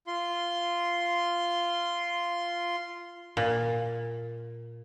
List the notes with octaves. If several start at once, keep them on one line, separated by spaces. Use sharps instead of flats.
F4 C6
A#2